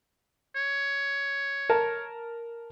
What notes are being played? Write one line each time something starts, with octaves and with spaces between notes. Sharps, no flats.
C#5
A#4 A5